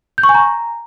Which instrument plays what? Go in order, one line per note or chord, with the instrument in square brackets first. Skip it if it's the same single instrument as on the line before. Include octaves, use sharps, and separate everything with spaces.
[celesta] G6
C#6
G#5
A#5